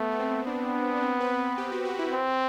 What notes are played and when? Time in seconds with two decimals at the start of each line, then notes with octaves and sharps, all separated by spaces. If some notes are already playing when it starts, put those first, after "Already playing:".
Already playing: A3 B3
0.12 B3
0.20 C4
0.47 B3 D4
0.96 D4
1.03 C4
1.20 B4
1.58 G4
1.72 F#4
1.85 F#4
1.99 E4
2.13 C4